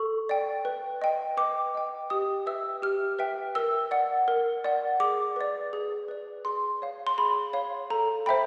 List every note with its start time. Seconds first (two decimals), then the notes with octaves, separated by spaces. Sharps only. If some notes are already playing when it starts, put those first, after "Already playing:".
Already playing: A4 C#6
0.29 D5 G5
0.65 B4
1.02 D#5 G5
1.37 B4 D6
1.75 D#5 G5
2.10 G4 D#6
2.46 B4 E5 G5 E6
2.82 G4 F6
3.19 B4 E5 G5
3.55 A#4 E6
3.91 D5 F#5
4.28 A#4
4.64 D5 F#5
5.00 G#4 D6
5.36 B4 D5
5.73 G#4
6.08 B4 D5
6.45 G#4 C6
6.82 C#5 F5
7.07 C6
7.18 G#4 B5
7.53 C#5 F5
7.90 A4 A#5
8.26 C5 E5 G5 B5